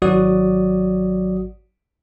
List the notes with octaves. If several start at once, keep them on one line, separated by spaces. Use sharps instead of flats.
G#1 F#3 F#4 D5 D#6